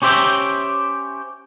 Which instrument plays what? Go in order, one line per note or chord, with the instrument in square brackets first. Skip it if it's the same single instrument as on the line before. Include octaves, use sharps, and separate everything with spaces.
[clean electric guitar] C#4 G4 C5 E5 G5